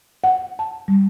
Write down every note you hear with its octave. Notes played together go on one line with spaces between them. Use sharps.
F#5
A5
G3